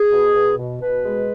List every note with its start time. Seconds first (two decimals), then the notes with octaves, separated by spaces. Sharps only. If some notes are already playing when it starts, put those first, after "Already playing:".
Already playing: G#4
0.12 B2
0.34 B2
0.58 B2
0.81 B2 B4
1.04 G#3